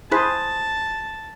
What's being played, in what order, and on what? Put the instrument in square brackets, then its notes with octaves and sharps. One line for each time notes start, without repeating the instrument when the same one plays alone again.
[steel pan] E4 G#4 C5 [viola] A5 [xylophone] B5 F#6 B6